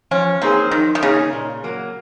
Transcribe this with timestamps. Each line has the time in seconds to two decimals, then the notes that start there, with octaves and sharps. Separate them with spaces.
0.11 F3 C#4
0.42 A#3 C4 D#4 G#4 C#5
0.71 D#3 F3
0.95 D#3
1.02 C#3 A#3 D#4 G#4 C#5
1.33 A#2
1.64 F#3 A#3